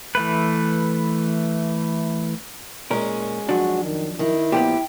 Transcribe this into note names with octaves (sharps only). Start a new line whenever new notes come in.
E3 A3 B4
A#2 G#3 C#4 A#4
F2 F#3 D4 F#4
D#3
D#3 E4
A#2 F3 B3 G4